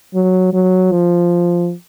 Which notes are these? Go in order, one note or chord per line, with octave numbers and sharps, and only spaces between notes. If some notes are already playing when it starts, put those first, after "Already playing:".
F#3
F#3
F3